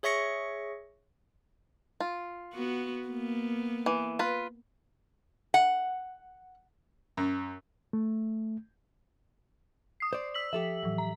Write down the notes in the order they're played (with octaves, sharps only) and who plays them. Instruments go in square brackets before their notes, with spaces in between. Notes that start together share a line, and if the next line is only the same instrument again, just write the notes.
[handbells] G#4 C#5 E5 C#6 A#6 C#7
[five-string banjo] F4
[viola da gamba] B3 F#4
A#3 B3
[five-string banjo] E3
F4 B4
[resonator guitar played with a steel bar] F#5
[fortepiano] F#2
[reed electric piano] A3
[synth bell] D#6 C7
[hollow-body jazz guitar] C5 D5
[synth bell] E6 B6 F#7
[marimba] F3 [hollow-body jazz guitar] G4 A4 E5
[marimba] A2 E3 F#3
[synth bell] A#5